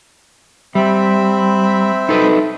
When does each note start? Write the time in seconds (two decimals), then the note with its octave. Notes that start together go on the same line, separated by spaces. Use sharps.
0.75 G3 C4 E5 B5
2.09 D#4 A4 B4